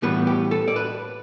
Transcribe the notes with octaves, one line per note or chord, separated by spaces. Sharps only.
A2 E3 G3 B3 B4
G4
A4
D5
B4